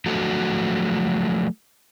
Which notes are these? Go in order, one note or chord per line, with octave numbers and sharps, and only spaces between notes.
F3 F#3 A3 F#4 A4